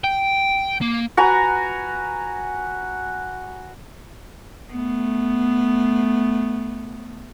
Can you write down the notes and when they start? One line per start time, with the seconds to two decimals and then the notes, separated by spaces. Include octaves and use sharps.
0.04 G5
0.81 A#3
1.17 F#4 B4 G#5 A#5
4.72 A3 B3